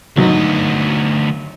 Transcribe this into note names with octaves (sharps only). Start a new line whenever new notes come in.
G#1 D2 F#3 B3 D#4